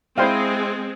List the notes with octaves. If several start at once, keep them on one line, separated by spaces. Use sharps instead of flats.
G#3 C4 E4 C5 F5 G5 C6 F6